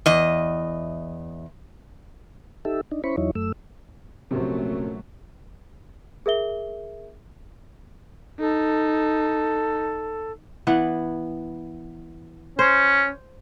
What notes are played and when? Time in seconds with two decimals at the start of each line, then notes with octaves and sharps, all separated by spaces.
0.06 E2 D#5
2.65 D#4 G4 A4 E5
2.91 D4 D#4
3.04 C#4 E4 C5 B5 C#6
3.17 E2 F#3 D#4 E4 C#5
3.35 F#2 A3 E6
4.31 A#1 F#2 C3 F#3 A3 C4
6.26 G#4 A#4 E5 G7
8.40 D#4 A4
10.67 E3 B3 F#5
12.59 C#4 C5